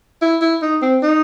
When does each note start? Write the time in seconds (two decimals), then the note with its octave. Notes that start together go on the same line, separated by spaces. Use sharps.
0.22 E4
0.41 E4
0.62 D#4
0.82 C4
1.03 D#4